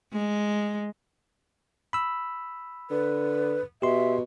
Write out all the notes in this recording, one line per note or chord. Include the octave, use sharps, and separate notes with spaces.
G#3
B5 E6
D3 B4
B2 G4 E5 C6